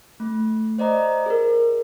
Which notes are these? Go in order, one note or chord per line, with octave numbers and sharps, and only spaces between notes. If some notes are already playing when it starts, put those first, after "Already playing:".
A3
C5 D5 D#5 A#5
G#4 A#4